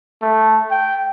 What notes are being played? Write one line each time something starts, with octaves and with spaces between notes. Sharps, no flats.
A3
G5